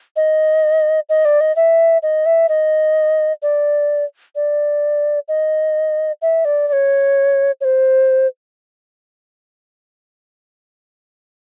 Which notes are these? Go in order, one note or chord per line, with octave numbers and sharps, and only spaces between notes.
D#5
D#5
D5
D#5
E5
D#5
E5
D#5
D5
D5
D#5
E5
D5
D5
C#5
C#5
C5